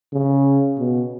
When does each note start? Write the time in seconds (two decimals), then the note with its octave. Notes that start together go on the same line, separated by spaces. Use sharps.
0.13 C#3
0.79 B2